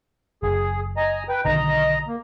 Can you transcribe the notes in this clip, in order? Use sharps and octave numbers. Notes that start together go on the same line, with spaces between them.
F#1 G#4
D#5 G#5 A#5
B4 G5
B1 D3 D#3 D#5 A#5
A#3